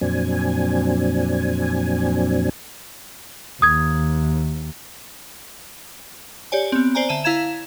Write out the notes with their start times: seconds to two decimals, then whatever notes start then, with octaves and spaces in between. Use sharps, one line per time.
0.01 F2 A#2 F#3 C4 D4 G#5
3.62 D#2 D#6 G#6
6.52 G4 C#5 D5 G#5
6.72 B3 C4
6.95 C5 D5 G#5 A#5
7.09 D3 E5 A5 D#7
7.24 E4 F5 A#5 G#6 E7